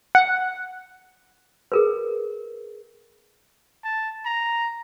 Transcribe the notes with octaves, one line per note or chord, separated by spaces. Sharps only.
F#5
G#4 A#4 B4
A5
A#5